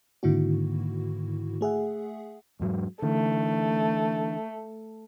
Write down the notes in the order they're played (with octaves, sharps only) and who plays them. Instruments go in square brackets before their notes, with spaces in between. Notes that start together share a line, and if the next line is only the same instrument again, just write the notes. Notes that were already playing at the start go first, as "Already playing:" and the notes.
[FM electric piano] G#2 D3 D#3 A#3 E4 F#4
A3 G#4 E5 F#5
[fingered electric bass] E2 G#2 F#3
[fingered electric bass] D3 E3 [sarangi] A3